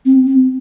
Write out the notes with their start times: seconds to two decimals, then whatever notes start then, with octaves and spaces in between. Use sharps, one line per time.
0.05 C4
0.27 C4